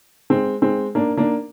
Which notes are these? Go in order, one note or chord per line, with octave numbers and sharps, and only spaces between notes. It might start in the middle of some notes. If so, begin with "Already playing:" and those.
G#3 C4
G#3 C4
A#3 D4
A#3 D4